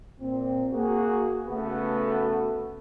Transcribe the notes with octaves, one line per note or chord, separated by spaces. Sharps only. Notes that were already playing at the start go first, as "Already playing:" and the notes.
A#2 C4
A#3 F#4 G#4
C#3 A3 B3 F#4 A4 B4